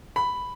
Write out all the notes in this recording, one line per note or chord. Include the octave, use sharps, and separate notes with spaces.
B5